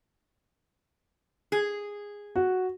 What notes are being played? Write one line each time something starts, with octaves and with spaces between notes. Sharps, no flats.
G#4
F#4